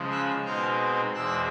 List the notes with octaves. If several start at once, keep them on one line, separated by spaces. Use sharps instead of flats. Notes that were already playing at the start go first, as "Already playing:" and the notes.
Already playing: C#3 F3 G#3
E6 F#6
B2 G#3 C4 D#4 F6 G6
E2 B2 G#3 C4 E6 F#6